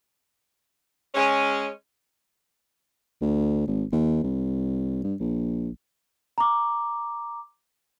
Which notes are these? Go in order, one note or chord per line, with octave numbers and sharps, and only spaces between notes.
G#3 C#4
D2
G#1
D#2
C2
G2
A#1
A#5 D6